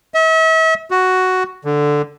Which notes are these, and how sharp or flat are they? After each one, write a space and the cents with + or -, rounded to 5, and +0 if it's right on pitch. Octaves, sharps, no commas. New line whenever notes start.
E5 -40
F#4 +5
D3 +0